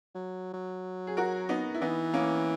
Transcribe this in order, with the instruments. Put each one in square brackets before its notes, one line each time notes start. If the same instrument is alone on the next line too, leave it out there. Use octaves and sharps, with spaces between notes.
[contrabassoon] F#3
F#3
[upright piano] G#4
F#4 A#4
B3 D#4
E4
[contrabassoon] E3 [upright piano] B3 D#4
[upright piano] A#3 C#4